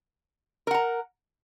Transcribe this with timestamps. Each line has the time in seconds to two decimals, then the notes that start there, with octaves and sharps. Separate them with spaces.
0.67 A#4
0.71 F#5
0.74 A#5